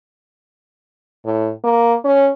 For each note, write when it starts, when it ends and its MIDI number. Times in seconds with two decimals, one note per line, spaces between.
1.25 1.50 45
1.64 1.95 58
2.04 2.30 61